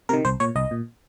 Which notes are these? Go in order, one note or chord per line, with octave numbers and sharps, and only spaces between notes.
C3 D#3 A#4
C2 C5
A#2 C#5
C2 D#5
A#2